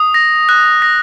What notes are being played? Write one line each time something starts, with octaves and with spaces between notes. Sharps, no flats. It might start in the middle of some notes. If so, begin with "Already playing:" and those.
Already playing: D#6
A#6
F#6
A#6